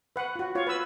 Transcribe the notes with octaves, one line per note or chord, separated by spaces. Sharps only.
B4 F#5
F4 F#4
F4 C#5
B4 E6